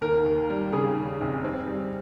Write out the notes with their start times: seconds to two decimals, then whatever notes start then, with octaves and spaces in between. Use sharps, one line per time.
0.01 D#2 A#4
0.26 D#2
0.50 G3
0.72 C#3 G#4
0.96 D#2
1.21 F1
1.44 C4
1.67 G3